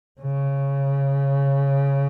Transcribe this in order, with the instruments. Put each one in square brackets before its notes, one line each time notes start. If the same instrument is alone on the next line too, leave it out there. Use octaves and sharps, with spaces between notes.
[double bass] C#3